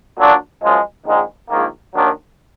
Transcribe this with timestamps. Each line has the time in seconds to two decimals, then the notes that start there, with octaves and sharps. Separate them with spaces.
0.18 A#2 F#3 D4
0.63 F#2 F3 G#3
1.06 A#1 G#2 D#3 G#3
1.49 A#1 G#2 D#3 A#3
1.94 D#2 D#3 F#3 D4